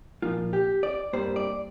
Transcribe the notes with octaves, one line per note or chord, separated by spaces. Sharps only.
A#2 F3 A#3 F4
G4
D5
G2 G3 A#3 C5
D5